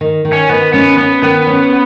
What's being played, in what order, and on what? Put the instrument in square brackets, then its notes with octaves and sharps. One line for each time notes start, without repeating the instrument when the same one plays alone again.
[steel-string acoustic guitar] D#3
D#3
[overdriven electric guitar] C#4
[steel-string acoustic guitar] D#3 [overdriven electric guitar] B3
[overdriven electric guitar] B3 [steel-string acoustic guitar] C#4
[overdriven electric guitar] B3 [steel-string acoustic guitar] C#4
[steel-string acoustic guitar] D#3 [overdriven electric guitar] B3
[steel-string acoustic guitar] C#4